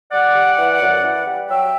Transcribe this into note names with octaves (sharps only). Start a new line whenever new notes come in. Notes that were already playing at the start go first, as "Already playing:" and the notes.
G3 D5 F#5
G3
E3
F#2
E3
G3
F#3 E5 G5